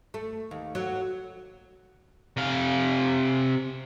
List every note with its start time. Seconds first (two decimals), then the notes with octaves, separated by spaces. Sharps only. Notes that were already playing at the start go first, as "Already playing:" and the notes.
0.14 A3
0.51 D#2
0.75 F#3
2.37 C3 F5